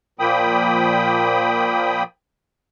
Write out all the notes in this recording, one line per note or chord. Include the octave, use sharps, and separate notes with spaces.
A#2 F3 A#3 G5 B5 D#6